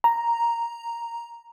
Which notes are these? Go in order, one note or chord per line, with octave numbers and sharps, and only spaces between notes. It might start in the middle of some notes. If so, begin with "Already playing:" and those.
A#5